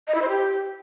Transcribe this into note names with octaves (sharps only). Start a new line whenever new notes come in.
D#5
E4
C5
G4